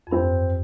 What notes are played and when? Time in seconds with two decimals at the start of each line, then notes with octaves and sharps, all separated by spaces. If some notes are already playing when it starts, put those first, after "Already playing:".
0.07 F2
0.11 G2 C4